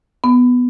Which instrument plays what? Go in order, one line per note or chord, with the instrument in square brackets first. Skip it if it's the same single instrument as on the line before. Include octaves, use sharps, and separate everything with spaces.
[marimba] B3